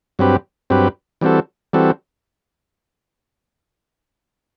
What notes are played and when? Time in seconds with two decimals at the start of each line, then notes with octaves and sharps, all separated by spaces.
0.19 G2 F#3 C4 G4 B4
0.70 G2 F#3 C4 G4 B4
1.21 E3 G3 C4 F#4 A4
1.73 E3 G3 C4 F#4 A4